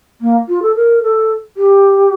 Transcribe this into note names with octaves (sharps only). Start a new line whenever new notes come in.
A#3
F4
A4
A#4
A4
G4